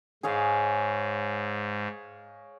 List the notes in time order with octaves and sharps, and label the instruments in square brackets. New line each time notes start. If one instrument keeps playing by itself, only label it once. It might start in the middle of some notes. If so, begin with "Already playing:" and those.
[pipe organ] G#2 [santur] G#4 C#5 F5